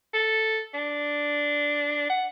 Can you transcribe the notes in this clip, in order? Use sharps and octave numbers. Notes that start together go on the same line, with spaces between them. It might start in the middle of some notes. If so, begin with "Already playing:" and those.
A4
D4
F#5